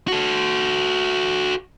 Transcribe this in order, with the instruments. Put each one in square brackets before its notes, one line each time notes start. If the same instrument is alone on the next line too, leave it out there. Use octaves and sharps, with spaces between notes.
[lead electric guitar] F#4 A4